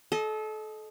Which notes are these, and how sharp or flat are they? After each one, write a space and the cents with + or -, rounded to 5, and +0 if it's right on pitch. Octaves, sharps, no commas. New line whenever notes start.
A4 -30 D#5 +0